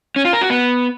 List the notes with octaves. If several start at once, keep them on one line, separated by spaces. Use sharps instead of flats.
C#4
F4
A#4
F#4
B3